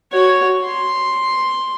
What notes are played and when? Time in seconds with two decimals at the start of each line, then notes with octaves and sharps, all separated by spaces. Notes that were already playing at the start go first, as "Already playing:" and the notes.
0.12 F#4 C#5
0.64 C6